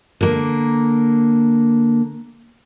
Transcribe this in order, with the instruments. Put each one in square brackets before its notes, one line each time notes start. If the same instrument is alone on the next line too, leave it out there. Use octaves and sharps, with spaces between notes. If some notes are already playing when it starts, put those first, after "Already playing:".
[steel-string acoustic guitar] D3 A#3